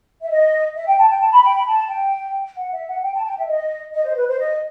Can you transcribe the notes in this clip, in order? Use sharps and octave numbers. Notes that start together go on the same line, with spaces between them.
E5
D#5
E5
G5
A5
G5
A5
B5
G5
B5
A5
G5
F#5
E5
F#5
G5
A5
G5
E5
D#5
D#5
C5
B4
C5
D#5